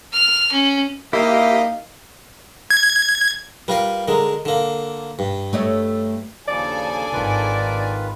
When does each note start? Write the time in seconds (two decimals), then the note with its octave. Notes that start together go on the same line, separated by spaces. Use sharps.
0.13 F6
0.52 C#4
1.13 A#3 D#4 E4 G4 D#5 F5
2.70 G#6
3.68 G3 F4 A#4 B4
4.08 D3 G#3 A#4
4.45 D3 A#3
5.19 G2
5.53 A3 C#5 D#5
6.48 D#2 C#3 F3 D4 A4 D5 G#5
7.13 G#1 D#3 F4 B4